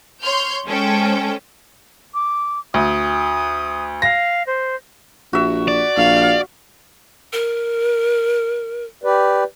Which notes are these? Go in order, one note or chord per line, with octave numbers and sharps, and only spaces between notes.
C#5 C6 F6 G6
G#3 C#4 A4 C5 G5
D6
D2 D#6
F5 A#6
C5
A#1 F#4 E5
D5
A#1 F5
A#4
G4 B4 D5